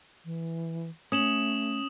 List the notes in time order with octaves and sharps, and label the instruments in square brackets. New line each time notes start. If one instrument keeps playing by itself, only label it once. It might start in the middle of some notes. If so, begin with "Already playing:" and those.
[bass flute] E3
[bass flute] A3 [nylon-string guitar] C#4 [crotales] D#6 E7 F#7